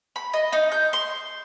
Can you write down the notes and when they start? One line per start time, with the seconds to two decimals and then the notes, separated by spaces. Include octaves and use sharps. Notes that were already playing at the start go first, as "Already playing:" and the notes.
0.16 B5
0.33 D#5
0.53 D#4
0.72 G6
0.93 C6